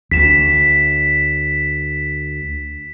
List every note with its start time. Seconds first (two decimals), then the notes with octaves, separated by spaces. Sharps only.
0.11 D2 B6 E7